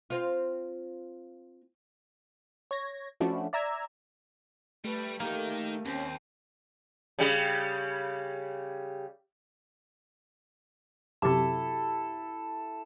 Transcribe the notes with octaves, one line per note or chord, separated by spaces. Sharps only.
C4 F4
C#5 G#6 A#6
F3 A3 C#4 D4 E4 F#4
D5 E5 A#5 E6 G#6
G3 A3 B4
D#3 A#3 D#4 G4 A#4
D#2 C4 C#4
C#3 G3 G4
F#2 C3 E4 F#4 G4 A4 A5 D6